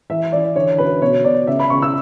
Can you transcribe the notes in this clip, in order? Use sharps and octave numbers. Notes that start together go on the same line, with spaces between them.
E3 E5
E3 D5
D3 C#5
F#2 B4
B2 C#5
B2 D5
C#2 E5
B5
C#2 C#6
E6